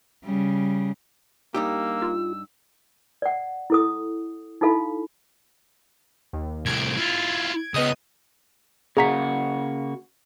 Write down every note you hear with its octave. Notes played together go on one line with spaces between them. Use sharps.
C#3 G3
G2 A#3 D#4 G4 E6
F4
D5 F#5
E4 A4 D#6
D#4 E4 F#4 A4 F5 B5
D#2
C2 A2 G#6 D7
E4 F4
C#2 B3 D#5 D#6
C#3 A#3 F#4 G#4 A#5 B6